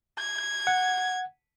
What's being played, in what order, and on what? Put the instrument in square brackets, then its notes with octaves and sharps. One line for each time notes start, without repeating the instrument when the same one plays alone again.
[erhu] G#6
[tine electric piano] F#5